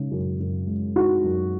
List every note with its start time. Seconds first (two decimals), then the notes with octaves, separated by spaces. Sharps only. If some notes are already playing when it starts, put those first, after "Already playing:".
Already playing: C#3 G#3 D#4
0.11 F#2
0.40 F#2
0.67 G#3
0.96 D#4 F#4
1.24 F#2